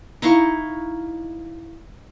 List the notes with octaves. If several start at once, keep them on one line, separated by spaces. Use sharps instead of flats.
D#4 E4 F5 C#6